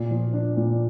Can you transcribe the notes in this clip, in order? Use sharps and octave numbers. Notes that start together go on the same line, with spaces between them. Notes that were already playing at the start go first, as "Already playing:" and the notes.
Already playing: A#2
F3
D4
A#2